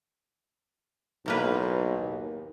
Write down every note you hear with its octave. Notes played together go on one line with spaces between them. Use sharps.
B1 A2 A#3 B4
D#2